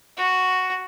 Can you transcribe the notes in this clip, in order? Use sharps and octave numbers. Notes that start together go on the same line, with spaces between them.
F#4